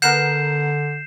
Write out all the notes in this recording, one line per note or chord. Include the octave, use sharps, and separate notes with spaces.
D3 B3 A#4 F#5 G6 C7 E7